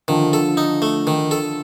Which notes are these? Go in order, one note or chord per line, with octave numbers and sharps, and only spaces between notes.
D3 D#3 F3
A4
D#4
A3
D#3
A4